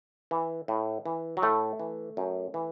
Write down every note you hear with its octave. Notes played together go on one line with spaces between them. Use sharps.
E3
A2
E3
F#3
A2 A3
E3
F#2
E3